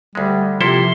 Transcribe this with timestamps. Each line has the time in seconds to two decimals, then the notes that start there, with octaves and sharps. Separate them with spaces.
0.15 D2 G3 G#3
0.61 C3 F3 A#3 E4 A4 C6